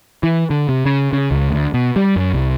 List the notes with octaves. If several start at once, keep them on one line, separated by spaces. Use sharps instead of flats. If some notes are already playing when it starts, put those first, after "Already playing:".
E3
D3
C3
C#3
C#3
C#2
D2
B2
G3
F#2
C2